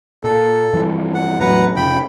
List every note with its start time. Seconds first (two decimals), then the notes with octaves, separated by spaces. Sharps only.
0.24 A#2 A4
0.73 G2 E3 F3
1.14 F#5
1.40 E2 A2 F#3 B4 F#5 A#5
1.76 F1 C#3 F3 G5 B5